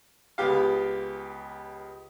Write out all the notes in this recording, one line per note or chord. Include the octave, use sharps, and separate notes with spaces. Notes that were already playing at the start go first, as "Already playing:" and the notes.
C#2 B3 G4 F5